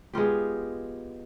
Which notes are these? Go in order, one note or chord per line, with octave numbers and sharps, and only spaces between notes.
G#3 B3 F4 G4